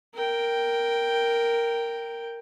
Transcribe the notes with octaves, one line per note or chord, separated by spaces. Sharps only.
A#4 G5